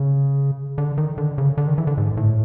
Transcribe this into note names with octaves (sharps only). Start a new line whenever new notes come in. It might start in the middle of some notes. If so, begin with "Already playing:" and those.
Already playing: C#3
D3
D#3
D3
C#3
D3
D#3
E3
D3
G#2
A2